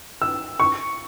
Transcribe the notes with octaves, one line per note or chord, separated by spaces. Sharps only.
E6
C#6